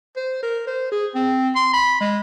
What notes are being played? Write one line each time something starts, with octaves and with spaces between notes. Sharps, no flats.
C5
A#4
C5
G#4
C4
C6
B5
G#3